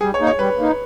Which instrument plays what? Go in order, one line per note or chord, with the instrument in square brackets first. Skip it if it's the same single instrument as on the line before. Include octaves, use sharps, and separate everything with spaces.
[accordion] G3 [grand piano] G#4
[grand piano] C#5
[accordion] A#3 D#4
[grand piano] C#5
[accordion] G3 [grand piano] B4
[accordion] A#3 D#4